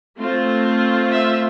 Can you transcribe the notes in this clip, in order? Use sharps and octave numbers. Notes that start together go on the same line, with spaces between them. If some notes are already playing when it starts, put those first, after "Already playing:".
A3 C4 F4
E5